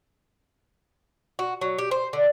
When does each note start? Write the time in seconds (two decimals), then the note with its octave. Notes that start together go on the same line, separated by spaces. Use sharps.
1.39 F#4
1.61 F#3
1.79 G4
1.91 C5
2.13 D3